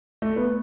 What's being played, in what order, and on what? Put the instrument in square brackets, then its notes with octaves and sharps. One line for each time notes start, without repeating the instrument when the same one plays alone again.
[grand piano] A3
B3